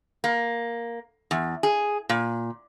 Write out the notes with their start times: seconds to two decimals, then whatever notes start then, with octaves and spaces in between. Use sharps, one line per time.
0.24 A#3
1.31 E2
1.63 G#4
2.09 A#2